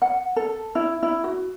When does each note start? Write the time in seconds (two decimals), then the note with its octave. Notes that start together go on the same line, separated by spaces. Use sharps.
0.02 F#5
0.36 A4
0.75 E4
1.03 E4
1.24 F#4